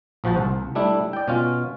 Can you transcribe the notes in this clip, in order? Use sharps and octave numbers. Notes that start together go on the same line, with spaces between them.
A#1 F3 F#4 C5 A5
C2
G3 A3 D4 E4
D5 G5
B2 C#4 F4